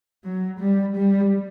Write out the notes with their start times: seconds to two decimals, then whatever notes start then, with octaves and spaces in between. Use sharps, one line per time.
0.24 F#3
0.60 G3
0.96 G3